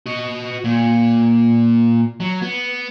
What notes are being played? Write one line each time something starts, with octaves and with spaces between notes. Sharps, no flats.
F#4 D#5
A#2
F#3
B3